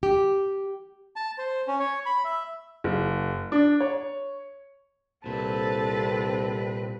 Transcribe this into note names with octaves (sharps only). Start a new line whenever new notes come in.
G4
A5
C5
C#4
C#5
B5
E5
F#1
D4
C#5
C2 A#2 C4 A4 B4 A5